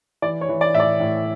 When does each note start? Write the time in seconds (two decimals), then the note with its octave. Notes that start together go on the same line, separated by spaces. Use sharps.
0.22 E3 D5
0.41 C#5
0.49 E3
0.61 D5
0.74 A2 E5
0.80 D5
1.00 A2